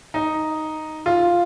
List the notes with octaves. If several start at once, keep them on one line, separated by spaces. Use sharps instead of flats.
D#4
F4